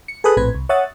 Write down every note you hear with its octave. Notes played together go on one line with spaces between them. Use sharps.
C#7
G#4 A4 B4 D#6 F#6
A#1 A2 C4 B4 G#6
C2
C#5 E5 F#5 D#6 A6